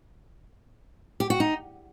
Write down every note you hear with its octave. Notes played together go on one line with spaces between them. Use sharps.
G4
F#4
D#4